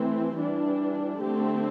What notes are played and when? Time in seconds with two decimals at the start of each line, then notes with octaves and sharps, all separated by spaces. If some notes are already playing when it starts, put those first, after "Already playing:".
Already playing: E3 A3 C4
0.35 E3 G3 D4
1.21 D3 A3 C4 G4